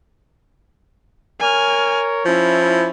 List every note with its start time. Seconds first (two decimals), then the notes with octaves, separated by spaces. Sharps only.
1.40 A#4 C#5 G#5 F6
2.25 F3 C#4 E4